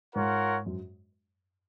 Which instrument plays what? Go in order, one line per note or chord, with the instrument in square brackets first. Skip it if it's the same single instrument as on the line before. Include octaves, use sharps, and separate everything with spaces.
[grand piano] G#2 [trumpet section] F4 A#4 C#5 F#5
[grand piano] F#2